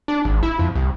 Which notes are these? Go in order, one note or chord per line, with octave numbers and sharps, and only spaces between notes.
D4
G#1
E4
F2
C2